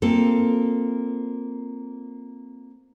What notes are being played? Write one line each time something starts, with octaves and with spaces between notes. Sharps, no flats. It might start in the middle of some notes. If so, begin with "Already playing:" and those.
A#3 C4 F4 A4